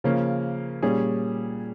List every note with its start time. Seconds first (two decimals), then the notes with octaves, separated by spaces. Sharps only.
0.04 C#3 F3 A#3 C#4
0.82 A#2 G3 C#4 G#4